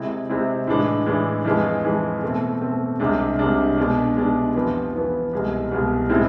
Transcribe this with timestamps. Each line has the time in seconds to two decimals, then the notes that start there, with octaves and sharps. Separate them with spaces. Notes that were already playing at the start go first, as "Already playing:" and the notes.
Already playing: C3 G#3 C4 E4
0.29 C3 G#3 C4 E4
0.67 A2 E3 G#3 D4
1.06 A2 E3 G#3 D4
1.45 F2 E3 G#3
1.84 F2 E3 G#3
2.23 B2 A3 C4
2.61 B2 A3 C4
2.99 C2 C3 G#3 D4
3.39 C2 C3 G#3 D4
3.78 B2 G#3 D4
4.17 B2 G#3 D4
4.55 F2 E3 B3
4.94 F2 E3 B3
5.33 C2 B2 G#3
5.71 C2 B2 G#3
6.09 A2 G#3 C4 E4